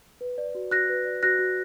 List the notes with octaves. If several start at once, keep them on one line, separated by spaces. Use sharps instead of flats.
B4
D5
F#4
F#4 F#6 A#6
B4
D5
F#4 F#6 A#6
F#4